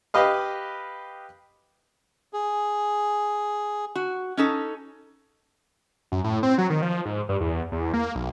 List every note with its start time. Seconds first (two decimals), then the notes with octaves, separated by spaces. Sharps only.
0.14 G4 B4 D#5 F5
2.33 G#4
3.95 F#4
4.37 C#4 D#4 A4
6.12 F#2
6.24 A2
6.43 C4
6.58 F#3
6.70 D#3
6.82 F3
7.06 G#2
7.29 G2
7.41 E2
7.72 E2
7.94 A#3
8.15 B1